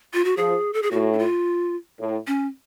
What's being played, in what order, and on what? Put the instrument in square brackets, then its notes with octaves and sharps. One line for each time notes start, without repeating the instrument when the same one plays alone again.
[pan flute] F4
F#4
[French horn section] F3 [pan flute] G#4
[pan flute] A4
G#4
[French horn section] A2 [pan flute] F#4
[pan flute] D4
F4
[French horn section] A2
[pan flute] C#4